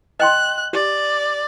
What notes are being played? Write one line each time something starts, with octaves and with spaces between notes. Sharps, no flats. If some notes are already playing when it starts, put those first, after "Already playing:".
D#5 G5 C6 F#6
G4 D5